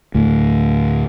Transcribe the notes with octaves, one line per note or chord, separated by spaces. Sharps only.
D2 A2